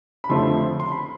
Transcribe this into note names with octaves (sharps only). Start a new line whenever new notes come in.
B5
F2 D3 F3 A3 C4 C6
C6
B5